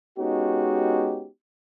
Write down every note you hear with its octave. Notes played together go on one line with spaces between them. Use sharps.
G#3 B3 C#4 D#4 F#4 G4